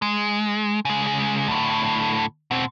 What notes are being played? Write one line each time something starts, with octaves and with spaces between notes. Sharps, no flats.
G#3
C#3 G#3
D2 A2
B2 C4